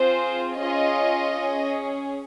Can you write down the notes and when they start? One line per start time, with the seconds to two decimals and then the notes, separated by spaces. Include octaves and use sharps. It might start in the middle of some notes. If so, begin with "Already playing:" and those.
Already playing: C4 F4 G#4 C5
0.60 C#4 F4 G#4 D#5
1.38 C#4 G#4